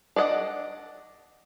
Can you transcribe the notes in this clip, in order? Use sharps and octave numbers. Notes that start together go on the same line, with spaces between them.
D4 D5 D#5 F#5